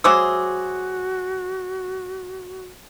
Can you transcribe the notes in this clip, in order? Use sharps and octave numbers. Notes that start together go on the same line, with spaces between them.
F#3 F#4 G#4 C5 E5 D6 E6